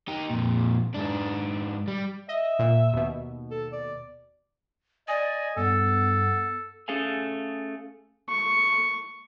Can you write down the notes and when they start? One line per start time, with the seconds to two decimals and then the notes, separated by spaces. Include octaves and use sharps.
0.08 D#4 G4
0.30 F2 A#2
0.94 G#2 D4
1.88 G3
2.29 D#5 E5
2.59 A#2
2.93 D#2 B2
3.51 A4
3.73 D5
5.08 D5 D#5 G#5
5.57 G2 B3 A4
6.88 A3 C#4 G#4 A4 F5 G#5
8.29 C#6